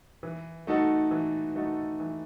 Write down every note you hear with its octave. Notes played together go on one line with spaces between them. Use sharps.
E3
A3 D#4 F#4 A4
E3
A3 D#4 F#4 A4
E3